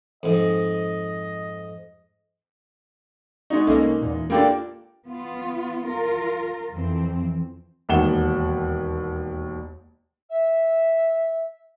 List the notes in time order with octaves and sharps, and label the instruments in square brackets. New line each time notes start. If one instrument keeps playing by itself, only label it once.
[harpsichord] F2 G#2 [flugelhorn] D#5
[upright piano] G#3 D#4 [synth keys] B3 C#6
[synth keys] C2 A#3 C#4 [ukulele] A4 D#5
[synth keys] E2 A#2
[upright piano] A#3 D4 [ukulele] E4 G4 [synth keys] F4 A4 D5
[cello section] B3 F4
F4 A#4
F2 E3 C4
[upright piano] E1 D#2 F#5 E7 G7
[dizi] E5